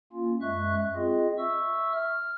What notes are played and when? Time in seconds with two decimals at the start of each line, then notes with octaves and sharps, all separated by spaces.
0.13 A#3 C#4 F4
0.41 F#2 G#3 E5 C#6 F#6
0.95 C4 F4 G#4 D#5
1.38 E5 C#6 E6
1.93 F6